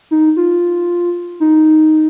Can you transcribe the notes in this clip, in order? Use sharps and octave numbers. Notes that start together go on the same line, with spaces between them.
D#4
F4
D#4